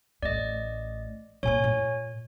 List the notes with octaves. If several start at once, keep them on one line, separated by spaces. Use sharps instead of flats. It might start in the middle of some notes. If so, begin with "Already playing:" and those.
A1 A3 D5 D#5
A#2 A#3 C#5 G#5
A#2